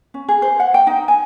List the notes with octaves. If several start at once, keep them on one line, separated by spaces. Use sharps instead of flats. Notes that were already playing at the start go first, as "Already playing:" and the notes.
C#4
G#4
C5
F#5
G5
D#4
G#5